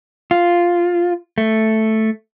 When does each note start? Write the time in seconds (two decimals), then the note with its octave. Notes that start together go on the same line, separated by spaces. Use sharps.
0.31 F4
1.38 A3